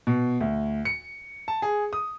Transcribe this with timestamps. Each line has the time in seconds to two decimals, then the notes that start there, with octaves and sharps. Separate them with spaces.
0.07 B2
0.40 D2
0.85 C#7
1.48 A5
1.62 G#4
1.93 D#6